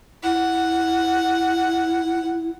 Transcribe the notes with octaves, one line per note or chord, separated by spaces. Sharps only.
E4 F#5